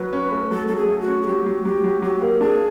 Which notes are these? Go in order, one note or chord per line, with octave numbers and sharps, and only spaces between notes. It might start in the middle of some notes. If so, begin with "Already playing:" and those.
Already playing: F#3 B4
C#4
A3
F#3 A4
F#3 A4
G#4
A3
F#4
C#4
G#4
F#3 G4
F#3
F#3 G4
F#3
F#3 G4
A#3
D4 G#4